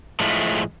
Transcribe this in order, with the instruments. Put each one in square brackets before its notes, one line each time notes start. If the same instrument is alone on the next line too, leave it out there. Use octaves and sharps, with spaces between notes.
[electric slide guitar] A2 F3 G#3 A3